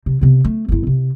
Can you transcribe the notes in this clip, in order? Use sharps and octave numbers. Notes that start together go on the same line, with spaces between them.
C3
C3 B3
A3
G1 E4
C3